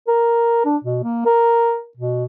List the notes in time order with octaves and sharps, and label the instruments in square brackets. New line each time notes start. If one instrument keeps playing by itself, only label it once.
[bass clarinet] A#4
D4
B2
A#3
A#4
B2